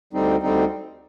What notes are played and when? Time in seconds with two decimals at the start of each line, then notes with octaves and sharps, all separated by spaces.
0.13 D2 D3 G3 C4 D#4
0.42 D2 D3 G3 C4 D#4